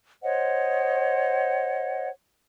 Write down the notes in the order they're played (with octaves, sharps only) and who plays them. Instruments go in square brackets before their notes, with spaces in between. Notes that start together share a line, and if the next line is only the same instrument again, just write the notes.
[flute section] C5 C#5 D#5 F#5